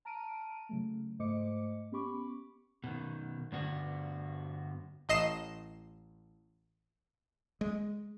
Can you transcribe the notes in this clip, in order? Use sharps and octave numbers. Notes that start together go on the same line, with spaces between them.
A5 A#5 F6 D7 D#7
C#3 F#3 A3
G#2 A3 C5 D#5 D6 C#7
B3 C#4 G4 B5 C#6 D6
B2 D#3
G2 D3 B3 F#4
A1 D#5 C7 E7
G#3